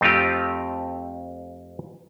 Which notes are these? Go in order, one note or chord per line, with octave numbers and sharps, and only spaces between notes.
F2 A3 C4 D#4 F4 G4